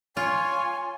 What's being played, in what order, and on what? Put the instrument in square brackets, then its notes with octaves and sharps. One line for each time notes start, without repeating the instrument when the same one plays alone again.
[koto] F4 [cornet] C#5 [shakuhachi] G#5 [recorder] C6